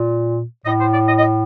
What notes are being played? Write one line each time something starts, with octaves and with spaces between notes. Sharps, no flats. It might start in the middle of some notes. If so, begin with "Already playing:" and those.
Already playing: A#2
A2 D#5
C5
D5
D#5
D#5